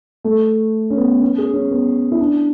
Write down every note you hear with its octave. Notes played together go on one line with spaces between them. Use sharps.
A3
C#4
B3
C#4
G#4
C#4
B3
E4
D4